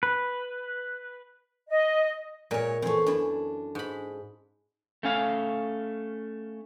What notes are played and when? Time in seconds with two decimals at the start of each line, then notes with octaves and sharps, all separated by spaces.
0.03 B4
1.69 D#5
2.51 A#2 G#3 A#4 C#5 E5
2.82 E2 A3 C4 C#5
3.06 F#2 D4 E4
3.75 G#2 B5
5.03 A3 C#4 F5